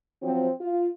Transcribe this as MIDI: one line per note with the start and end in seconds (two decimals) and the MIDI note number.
0.22 0.49 53
0.22 0.49 54
0.22 0.49 60
0.60 0.86 65